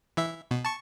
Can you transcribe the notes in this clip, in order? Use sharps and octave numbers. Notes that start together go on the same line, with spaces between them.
E3 E5
B2
A5 C#6